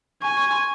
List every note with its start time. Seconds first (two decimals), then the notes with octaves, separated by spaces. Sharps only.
0.22 G#5 C#6
0.37 C#6
0.52 C6